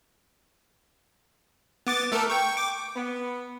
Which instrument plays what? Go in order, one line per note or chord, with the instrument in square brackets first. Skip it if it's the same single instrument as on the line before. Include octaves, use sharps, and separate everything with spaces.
[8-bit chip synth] B3 D6 A6
A3 A4 A#4
G5 C#6
D6
[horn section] B3